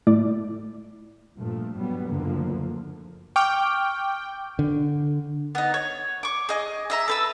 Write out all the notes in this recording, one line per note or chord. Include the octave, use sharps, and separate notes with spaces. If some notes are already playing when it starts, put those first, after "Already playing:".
A2 A3 E4 D5 D6
G2 A#2 F3 A3
F#3 G3 B3
F#1 D2 D3 F3 A#3
G5 C#6 D6 F6
D3
B3 D#4
C#5
C#6 D6
G#4 D#5
D#5 E5 A#5
A4 B4 E6